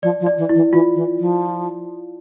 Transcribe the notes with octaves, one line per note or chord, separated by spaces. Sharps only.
F3 D5
F3
D5
E3
E4
E3
E3 F4
E3
F3